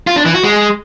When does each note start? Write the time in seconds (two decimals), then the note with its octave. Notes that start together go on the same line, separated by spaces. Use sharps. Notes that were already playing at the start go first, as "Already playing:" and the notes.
0.07 F4
0.16 D4
0.25 E3
0.34 F#4
0.44 G#3